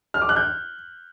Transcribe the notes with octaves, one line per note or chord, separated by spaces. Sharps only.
F6
D6
F#6
G6